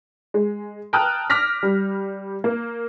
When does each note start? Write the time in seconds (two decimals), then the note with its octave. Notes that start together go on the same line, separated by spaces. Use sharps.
0.34 G#3
0.93 G5 A5 A#5 D#6 F6 F#6
1.30 D6 F6 A#6 B6
1.63 G3
2.44 A#3